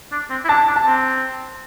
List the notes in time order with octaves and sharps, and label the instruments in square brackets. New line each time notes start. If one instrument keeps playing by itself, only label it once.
[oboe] D4
C4
E4
[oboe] D4 [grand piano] A5
[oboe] D4
[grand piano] A5
[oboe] C4